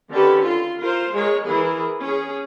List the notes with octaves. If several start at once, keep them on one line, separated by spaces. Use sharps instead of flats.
D3 D#3 C#4 G4 A4 B4
F4 C6
F4 A#4 C5
G#3 A#4 C#5
E3 G#4 A#4
C#4 G#4